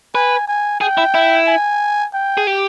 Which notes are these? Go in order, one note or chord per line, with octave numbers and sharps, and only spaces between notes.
B4 G#5
G#5
G#4 G5
E4
E4
G#5
G5
G#4
G4